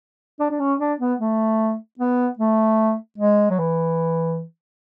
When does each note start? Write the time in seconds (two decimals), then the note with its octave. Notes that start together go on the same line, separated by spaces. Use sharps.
0.40 D4
0.51 D4
0.60 C#4
0.80 D4
1.00 B3
1.20 A3
2.00 B3
2.39 A3
3.18 G#3
3.50 F#3
3.59 E3